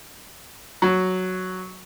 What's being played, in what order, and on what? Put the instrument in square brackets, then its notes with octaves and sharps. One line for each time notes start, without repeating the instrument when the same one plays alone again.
[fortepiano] F#3